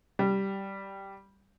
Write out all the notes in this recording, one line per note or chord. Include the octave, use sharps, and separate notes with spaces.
G3